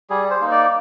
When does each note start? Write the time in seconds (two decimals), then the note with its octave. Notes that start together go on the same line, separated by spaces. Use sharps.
0.10 G3 G#4
0.31 C5
0.41 A#3 D#4
0.51 D5